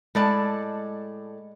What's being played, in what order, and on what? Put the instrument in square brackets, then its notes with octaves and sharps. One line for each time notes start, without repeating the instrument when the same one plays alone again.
[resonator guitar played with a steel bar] A2 A4 D5 [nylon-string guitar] G#3 A5